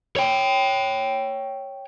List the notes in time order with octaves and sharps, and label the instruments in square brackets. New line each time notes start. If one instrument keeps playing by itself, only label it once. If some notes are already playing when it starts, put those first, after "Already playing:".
[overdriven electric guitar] C#5 G5